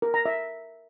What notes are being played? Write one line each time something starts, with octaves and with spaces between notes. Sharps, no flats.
A#4
A#5
E5